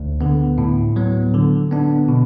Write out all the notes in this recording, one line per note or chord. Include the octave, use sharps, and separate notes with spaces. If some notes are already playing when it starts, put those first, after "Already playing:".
Already playing: D2
D3 B3
A2
F#3 B3
D3
B3 D4
B2